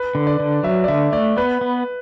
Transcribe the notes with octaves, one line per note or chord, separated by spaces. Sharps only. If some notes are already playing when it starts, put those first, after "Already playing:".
Already playing: B4
D3
D5
D3
F#3 E5
D5
D3 E5
A3 D5
B3 B4
B3